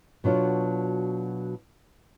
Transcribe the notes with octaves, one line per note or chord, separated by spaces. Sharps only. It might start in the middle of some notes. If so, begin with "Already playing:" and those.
B2 F#3 D4 F4